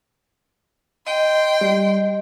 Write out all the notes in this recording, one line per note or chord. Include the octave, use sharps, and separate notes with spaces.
D#5 G5 C6
G3